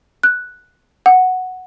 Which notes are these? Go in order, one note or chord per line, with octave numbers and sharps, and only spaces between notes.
F#6
F#5